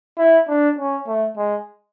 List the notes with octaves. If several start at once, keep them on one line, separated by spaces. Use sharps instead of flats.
E4
D4
C#4
A3
G#3